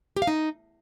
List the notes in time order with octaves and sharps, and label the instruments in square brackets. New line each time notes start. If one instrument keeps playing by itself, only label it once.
[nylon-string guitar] G4
F5
D#4